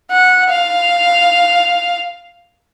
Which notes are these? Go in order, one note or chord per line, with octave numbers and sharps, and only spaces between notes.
F#5
F5